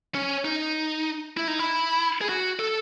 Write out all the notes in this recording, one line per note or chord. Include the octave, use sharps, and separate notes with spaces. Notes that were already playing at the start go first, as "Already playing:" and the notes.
C#4
D#4
E4
D#4
E4
G#4
F#4
A4